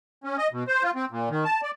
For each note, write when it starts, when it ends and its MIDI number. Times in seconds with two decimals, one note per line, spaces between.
0.24 0.37 61
0.38 0.48 75
0.53 0.64 47
0.68 0.83 72
0.83 0.91 65
0.95 1.05 60
1.11 1.29 46
1.30 1.44 51
1.45 1.61 81
1.62 1.71 74